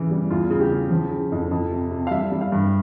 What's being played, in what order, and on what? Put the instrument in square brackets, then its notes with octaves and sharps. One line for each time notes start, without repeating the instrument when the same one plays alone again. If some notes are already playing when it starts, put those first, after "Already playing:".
Already playing: [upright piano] C#3 E3
G3
E2 F4
C#3
G4
C#3
F3
C#3
F2
F2
C3
C3
F5
G3 E5
G3
F5
G2